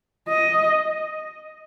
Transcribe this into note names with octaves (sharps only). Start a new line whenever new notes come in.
D#5